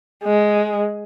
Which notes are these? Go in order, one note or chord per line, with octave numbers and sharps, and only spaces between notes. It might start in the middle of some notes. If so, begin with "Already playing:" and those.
G#3